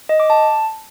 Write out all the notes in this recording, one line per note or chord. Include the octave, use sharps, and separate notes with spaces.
D#5
D6
A5